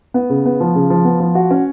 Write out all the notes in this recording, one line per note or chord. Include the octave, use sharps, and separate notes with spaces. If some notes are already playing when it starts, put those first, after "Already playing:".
B3
C#3
B3
F3
C#3
F3
B3
F3
F#4
C#4